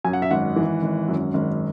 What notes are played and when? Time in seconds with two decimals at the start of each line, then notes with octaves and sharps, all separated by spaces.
0.04 F#2 G#5
0.13 F#5
0.22 E5
0.31 G#1 F#5
0.56 E3
0.82 G#1
1.08 F#2
1.34 G#1